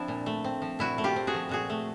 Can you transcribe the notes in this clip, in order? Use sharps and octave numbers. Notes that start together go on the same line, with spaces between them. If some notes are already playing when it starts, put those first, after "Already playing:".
Already playing: F3 C4 D4 E4
A#2
A3
C4
F3
A#2 E4 F#4
A3
F4 G4
C4
F#4 G#4
F3
A#2 F#4 G#4
A3